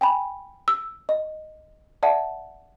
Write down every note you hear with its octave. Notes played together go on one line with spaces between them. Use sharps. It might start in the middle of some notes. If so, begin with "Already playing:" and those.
G5 G#5 B5
E6
D#5
D5 E5 F#5 A5